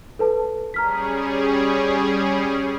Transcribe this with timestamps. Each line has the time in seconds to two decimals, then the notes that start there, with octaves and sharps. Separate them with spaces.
0.19 A4 B4 A5
0.74 G3 C#4 G#4 A#5 F6 B6